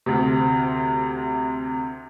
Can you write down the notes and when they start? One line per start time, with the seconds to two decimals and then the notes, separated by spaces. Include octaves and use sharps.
0.06 D2 C3